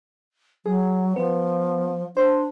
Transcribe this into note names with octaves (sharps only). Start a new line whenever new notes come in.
F#3 G#4
F3 B3
D4 C5